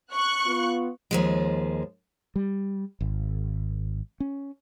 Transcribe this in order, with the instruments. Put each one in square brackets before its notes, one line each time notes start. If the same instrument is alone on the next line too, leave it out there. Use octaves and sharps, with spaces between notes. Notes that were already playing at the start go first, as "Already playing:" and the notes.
[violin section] C#6 F#6
[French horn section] B3 F4
[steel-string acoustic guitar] D#2 F3 G#3
[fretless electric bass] G3
G#1
C#4